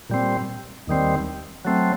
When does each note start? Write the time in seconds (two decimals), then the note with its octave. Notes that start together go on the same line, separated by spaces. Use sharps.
0.10 A#2 G3 C4
0.87 D#2 D#3 G3 C4
1.65 F#3 A3 C4